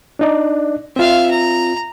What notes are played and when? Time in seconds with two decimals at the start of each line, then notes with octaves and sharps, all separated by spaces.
0.19 D4 D#4 D5
0.96 C4 F4 E5 F5
1.31 A#5